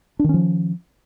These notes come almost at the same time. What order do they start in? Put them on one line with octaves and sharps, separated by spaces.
D4 D#3 C#4 F3